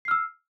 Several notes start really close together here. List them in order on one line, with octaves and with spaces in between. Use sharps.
C7 F6 E6